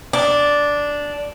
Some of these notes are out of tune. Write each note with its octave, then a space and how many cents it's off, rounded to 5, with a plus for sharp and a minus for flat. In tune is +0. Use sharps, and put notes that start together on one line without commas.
D4 -5